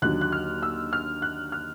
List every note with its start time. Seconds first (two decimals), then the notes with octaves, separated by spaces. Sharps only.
0.02 D#2 D3 F#3 F#6
0.21 F#6
0.32 F6
0.63 E6
0.93 F6
1.22 F#6
1.52 F6